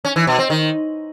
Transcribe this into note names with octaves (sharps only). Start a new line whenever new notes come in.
C#4
E3
B2
C4
D#3